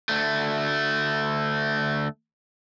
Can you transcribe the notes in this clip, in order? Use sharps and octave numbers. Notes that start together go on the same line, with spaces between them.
D2 A3